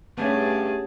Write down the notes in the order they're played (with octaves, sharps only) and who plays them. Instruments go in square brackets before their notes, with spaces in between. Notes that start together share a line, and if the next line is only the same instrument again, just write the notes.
[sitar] G2 [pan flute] A3 [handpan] B3 C#4 [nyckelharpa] G#4 A5